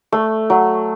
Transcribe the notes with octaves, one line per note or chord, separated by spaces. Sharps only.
A3
F#3